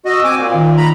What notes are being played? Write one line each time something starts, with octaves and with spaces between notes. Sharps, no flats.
F#4 D#5 E6
C4 G#5 D6
A#2 F5
D#3
A#5 B5